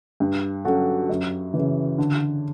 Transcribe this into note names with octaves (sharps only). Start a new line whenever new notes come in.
G2
F#3 C#4 F#4 A4
F#2
C#3 E3
D3